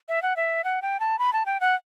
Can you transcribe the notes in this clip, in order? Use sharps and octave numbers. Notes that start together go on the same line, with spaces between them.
E5
F#5
E5
F#5
G5
A5
B5
A5
G5
F#5